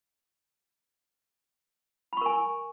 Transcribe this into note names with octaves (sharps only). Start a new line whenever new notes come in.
A#4 G#5 B5 C#6